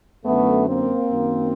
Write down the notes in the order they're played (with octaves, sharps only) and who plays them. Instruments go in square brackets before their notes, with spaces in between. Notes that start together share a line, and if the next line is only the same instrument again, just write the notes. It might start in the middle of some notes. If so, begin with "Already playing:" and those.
[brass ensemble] F#2 D3 A3 B3
A#3 C4
F#2 D#3